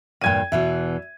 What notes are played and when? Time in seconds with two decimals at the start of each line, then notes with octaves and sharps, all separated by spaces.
0.21 E2 G2 A#2 G5 G#6 D#7
0.52 E2 B2 E3 E5